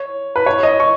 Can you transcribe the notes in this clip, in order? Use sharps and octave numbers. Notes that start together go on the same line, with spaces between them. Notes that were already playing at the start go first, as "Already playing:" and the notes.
Already playing: C#5
B4
C#5
D#5
C#6